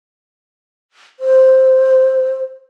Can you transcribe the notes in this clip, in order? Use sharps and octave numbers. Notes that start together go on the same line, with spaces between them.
C5